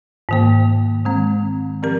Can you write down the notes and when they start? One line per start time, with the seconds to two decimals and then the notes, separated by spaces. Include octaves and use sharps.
0.29 G#2 D#3 A#3
1.05 D#3 G#3 C4
1.83 F3 C4 G4 A#4